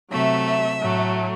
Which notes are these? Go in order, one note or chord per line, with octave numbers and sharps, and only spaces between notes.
C3 F#3 A3 E5
A2 F#3 A3